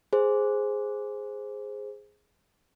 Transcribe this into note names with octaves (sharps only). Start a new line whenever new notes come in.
G#4 C5